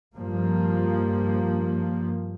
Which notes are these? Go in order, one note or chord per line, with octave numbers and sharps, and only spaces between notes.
G2 F3 A#3